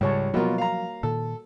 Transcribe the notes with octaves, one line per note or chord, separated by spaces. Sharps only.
C#2 G#2 C#3 G3 C#5 A5
B2 F3 F#3 A#3 F4 F#4 A#4
F5 A#5
A#2 D#3 A4